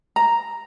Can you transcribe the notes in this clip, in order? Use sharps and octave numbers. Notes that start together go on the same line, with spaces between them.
A#5